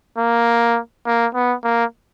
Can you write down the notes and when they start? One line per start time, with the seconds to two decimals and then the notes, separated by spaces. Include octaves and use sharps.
0.18 A#3
1.06 A#3
1.34 B3
1.64 A#3